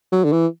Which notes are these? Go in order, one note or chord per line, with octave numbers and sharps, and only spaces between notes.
F#3
D3
E3